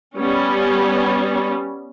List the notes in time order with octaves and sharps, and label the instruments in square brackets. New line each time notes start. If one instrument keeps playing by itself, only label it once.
[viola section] G3 B3 C#4